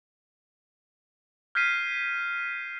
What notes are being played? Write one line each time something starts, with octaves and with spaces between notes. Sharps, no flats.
F6 G6 G#6 B6 C7 D#7